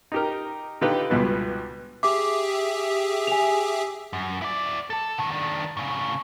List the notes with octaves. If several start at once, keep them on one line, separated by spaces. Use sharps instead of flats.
D#4 G4 A#4
D3 D#4 F4 G4 B4
C#2 G2 B2 B3
G4 G#4 E5 D6
G#5 F7
F#2
E4 D5
A4 A5
B2 D#3
D#3 D4
A2 C#3